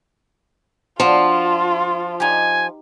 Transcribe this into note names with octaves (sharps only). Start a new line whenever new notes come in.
F3 D4 F4 F#4 A5
D#4 G4 G#5